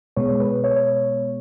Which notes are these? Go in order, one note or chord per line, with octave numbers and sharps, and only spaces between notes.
B2 G#3 B3 C#5
B4
C#5